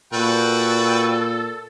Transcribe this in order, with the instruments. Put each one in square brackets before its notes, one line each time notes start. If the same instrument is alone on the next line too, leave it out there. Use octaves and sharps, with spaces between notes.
[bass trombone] A#2 [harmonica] F#4 B4 G5 [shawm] A4